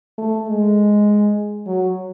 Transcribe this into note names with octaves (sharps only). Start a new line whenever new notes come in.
A3
G#3
F#3